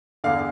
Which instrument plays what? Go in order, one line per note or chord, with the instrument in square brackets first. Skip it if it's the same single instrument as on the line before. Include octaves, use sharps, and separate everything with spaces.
[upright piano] E2 D3 F5